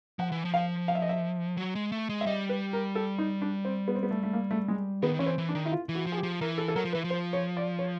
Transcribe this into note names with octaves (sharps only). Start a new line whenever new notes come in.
F3 F#5
E3
F3
F5
F5
E5
D#5
E5
F#3
G#3
A3
G#3
E5
G3 D#5
B4
A#4
A4
D#4
D4
C4
B3
C4
B3
A3
A3
A#3
A3
G#3
D#3 B3
E3 C#4
C4
E3
D4
D#3
E4
F4
E3
F#4
F3
G#4
G4
F3
E3 A#4
A4
A4
F#3 A#4
F3
E3 B4
F3
C5
C#5
D5
C#5